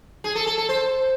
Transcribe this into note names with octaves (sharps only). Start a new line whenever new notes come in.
G#4
A4
A4
A4
C5